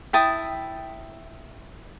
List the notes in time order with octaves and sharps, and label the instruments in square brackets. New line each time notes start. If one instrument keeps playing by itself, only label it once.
[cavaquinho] E4 G5 A5 D#6